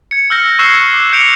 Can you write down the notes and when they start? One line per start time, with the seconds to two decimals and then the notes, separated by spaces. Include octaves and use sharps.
0.11 G#6 C#7
0.30 E6 F6 G6 A#6 C#7
0.59 C#6 E6 F#6 G#6 C7 E7
0.94 D6
1.12 E6 G6 C#7 D7 F7